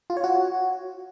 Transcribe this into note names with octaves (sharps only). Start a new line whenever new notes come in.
F4
C#5
F#4